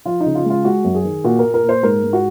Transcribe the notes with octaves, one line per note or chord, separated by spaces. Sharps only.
F3 F4
D#4
C#3
F4
G#3 F4
G#3 F#4
F#2
G#4
D#3
A#2 F#4
A#4
A#2
A#4
A#2
C5
G#2 A#4
G#2
F#4